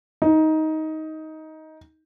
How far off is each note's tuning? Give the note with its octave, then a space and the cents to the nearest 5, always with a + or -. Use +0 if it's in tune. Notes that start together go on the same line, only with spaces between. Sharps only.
D#4 +15